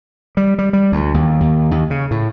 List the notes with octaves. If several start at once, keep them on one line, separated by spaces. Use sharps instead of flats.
G3
G3
G3
D2
D#2
D#2
D#2
C#3
A2